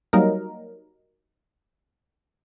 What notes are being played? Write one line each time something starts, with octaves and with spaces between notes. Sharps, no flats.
F#3 G3 A#3 D#4 A#4